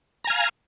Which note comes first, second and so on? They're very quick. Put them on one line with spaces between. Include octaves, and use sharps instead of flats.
A#5 G#5 F5